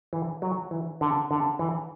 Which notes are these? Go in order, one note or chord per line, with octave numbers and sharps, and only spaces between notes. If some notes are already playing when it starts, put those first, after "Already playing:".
E3
F#3
E3
D3
D3
E3